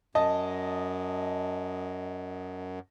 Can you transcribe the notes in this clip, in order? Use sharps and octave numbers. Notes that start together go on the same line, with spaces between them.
F#2 D#5 A5